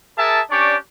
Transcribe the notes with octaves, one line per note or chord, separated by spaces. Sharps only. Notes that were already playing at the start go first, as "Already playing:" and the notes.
G#4 A#4 E5 A5
C#4 D4 G4 D5 C#6 D6